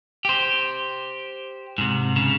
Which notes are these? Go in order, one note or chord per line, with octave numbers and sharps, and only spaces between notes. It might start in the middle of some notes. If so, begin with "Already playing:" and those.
G4 C5
G#2 C3
C#3